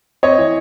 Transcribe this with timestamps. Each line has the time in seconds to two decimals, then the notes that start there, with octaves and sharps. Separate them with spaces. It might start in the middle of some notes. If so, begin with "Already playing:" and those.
0.23 C4 C#5 D#5
0.38 E3